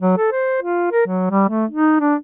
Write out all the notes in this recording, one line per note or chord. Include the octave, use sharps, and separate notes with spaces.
F#3
A4
C5
F4
A#4
F#3
G3
A3
D#4
D4